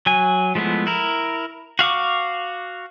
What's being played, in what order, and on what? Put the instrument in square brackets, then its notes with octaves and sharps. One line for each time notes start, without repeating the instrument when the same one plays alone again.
[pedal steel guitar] F#3 G#5
F3 G#3 A3 B3 E4
E4 A#4
F#4 F5 C#6 D6